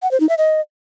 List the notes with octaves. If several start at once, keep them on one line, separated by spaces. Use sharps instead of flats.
F#5
C5
D#4
E5
D#5